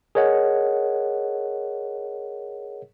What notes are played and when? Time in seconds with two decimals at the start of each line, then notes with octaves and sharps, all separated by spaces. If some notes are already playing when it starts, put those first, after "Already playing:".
0.15 G#4 A#4 C#5 D#5 F#5